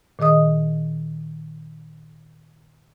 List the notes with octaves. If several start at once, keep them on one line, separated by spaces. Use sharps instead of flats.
A#2 D#3 G#4 D#5 D#6